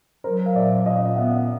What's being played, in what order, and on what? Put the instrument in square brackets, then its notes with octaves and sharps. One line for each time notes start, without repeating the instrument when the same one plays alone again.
[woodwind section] F#3 [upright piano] A#4 C5
[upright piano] F5
[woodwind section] A#2 [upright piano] D5 E5
[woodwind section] A#2 [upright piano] D#5 F5
[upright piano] F5
[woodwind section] B3 [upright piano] E5 F#5